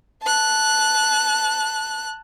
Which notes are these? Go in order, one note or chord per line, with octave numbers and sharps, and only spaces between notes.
A5 F#6